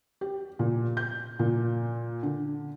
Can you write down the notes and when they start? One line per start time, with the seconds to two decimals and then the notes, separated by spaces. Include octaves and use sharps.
0.21 G4
0.59 A#2
0.97 G6
1.39 A#2
2.23 D3